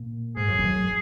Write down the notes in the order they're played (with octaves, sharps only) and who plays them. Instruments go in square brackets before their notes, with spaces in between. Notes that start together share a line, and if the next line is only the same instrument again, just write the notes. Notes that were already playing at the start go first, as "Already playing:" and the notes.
Already playing: [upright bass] A#2
[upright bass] G#2 [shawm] G#4
[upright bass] F#2
F#2